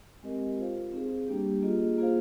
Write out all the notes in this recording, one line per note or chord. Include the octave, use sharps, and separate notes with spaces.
G#3 C4 G4 A#4 D#5
F4 C5 F5
C4 D#4 G#4
G3 A#3 D4 G4
A#3 F4 G#4 D#5
A#3 F4 G#4 C5 F5